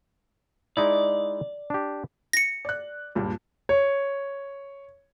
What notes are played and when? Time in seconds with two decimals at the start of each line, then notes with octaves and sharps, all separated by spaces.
0.77 G#3 D#4 E4 D5
1.70 D4 G4
2.33 A#6 C#7
2.65 D5 F#6
3.15 C#2 G2 A#2
3.69 C#5